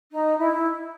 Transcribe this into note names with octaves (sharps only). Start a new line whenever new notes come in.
D#4
E4